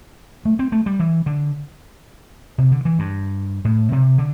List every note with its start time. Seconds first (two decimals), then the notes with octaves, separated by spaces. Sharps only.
0.45 A3
0.59 C4
0.72 A3
0.86 G3
0.99 E3
1.26 D3
2.58 C3
2.72 D3
2.85 E3
2.99 G2
3.65 A2
3.92 C3
4.18 D3